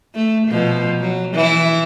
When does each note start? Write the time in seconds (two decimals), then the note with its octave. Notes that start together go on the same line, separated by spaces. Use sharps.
0.15 A3
0.48 B2 F3
1.00 F#3
1.34 E3 E4